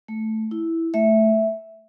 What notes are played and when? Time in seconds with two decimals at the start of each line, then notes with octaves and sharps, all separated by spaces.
0.08 A3
0.51 E4
0.94 A3 E5